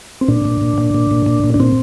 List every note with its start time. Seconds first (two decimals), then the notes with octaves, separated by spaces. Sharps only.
0.21 C4
0.28 A#2 D4
0.45 A#2
0.61 A#2
0.78 A#2
0.94 A#2
1.11 A#2
1.26 A#2
1.44 A#2
1.54 D4
1.60 A#2 C4